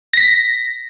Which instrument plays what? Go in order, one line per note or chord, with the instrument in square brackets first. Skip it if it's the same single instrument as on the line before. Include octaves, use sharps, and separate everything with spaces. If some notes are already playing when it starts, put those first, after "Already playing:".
[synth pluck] A#6 B6